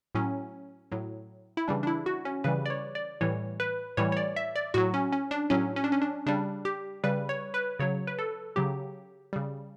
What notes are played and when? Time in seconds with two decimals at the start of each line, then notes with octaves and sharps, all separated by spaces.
0.15 A2 F#3 C#4
0.92 A2 F#3
1.57 E4
1.68 C#3 E3 G3 D4
1.83 D4
1.87 E4
2.06 F#4
2.25 C#4
2.44 C#3 E3 G3 B4
2.66 D5
2.70 C#5
2.95 D5
3.21 A2 E3 G3 C#5
3.60 B4
3.97 A2 E3 G3 C#5
4.12 C#5
4.17 D5
4.36 E5
4.56 D5
4.74 A2 F#3 F#4
4.94 C#4
5.12 C#4
5.31 D4
5.50 A2 F#3 C#4
5.76 C#4
5.84 D4
5.92 C#4
6.02 D4
6.26 C#3 G3 D4
6.65 G4
7.04 C#3 G3 B4
7.29 C#5
7.54 B4
7.79 C#3 F#3 C#5
8.07 B4
8.19 A4
8.56 C#3 F#3 G4
9.33 C#3 G3